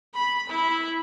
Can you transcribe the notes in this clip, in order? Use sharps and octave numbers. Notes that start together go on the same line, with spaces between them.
B5
E4